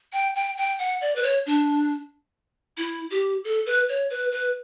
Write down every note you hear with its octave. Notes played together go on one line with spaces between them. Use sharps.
G5
G5
G5
F#5
D5
B4
C#5
D4
E4
G4
A4
B4
C#5
B4
B4